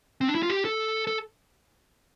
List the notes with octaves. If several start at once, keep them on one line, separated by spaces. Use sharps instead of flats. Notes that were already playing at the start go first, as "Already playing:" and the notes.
C4
D4
E4
F4
G4
A4
A4